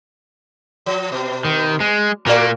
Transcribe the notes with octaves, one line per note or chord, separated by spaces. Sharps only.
F3
B2
D#3
G#3
A#2 A3 A#3 F#4 D5